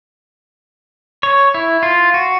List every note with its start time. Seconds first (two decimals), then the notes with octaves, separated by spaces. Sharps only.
1.23 C#5
1.54 E4
1.83 F4
2.14 F#4